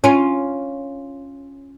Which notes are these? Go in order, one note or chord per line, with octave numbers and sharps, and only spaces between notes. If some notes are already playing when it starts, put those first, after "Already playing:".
C#4 F4